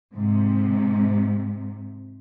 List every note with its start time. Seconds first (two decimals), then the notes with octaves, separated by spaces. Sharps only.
0.14 G#2 C3